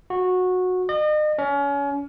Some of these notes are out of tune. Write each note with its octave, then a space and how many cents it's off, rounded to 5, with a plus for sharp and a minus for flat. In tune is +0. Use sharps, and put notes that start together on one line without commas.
F#4 -15
D#5 -40
C#4 +30